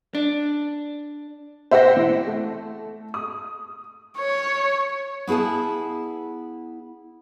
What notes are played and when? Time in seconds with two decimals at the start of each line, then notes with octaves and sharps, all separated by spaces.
0.15 D4
1.71 C5 E5 F#5 G5 A#6
1.96 E3
2.26 A3
3.14 D#6
4.18 C#5
5.27 B3 E4 G#4 F5 A5